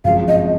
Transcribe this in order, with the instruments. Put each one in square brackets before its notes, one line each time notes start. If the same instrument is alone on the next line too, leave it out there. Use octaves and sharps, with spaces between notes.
[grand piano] G#1 F#2 C#3 F3 G#3 [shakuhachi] F5
[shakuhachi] D#5